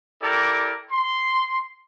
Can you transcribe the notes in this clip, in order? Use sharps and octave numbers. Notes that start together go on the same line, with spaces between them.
E4 G4 A4 A#4 D5
C6